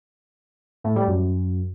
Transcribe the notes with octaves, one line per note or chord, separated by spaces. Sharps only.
A2
G3
F#2